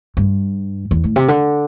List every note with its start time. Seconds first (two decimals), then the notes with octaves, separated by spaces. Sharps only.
0.17 G2
0.91 E2
1.04 A2
1.16 C3
1.28 D3